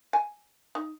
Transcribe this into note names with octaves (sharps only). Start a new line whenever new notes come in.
G#5
D#4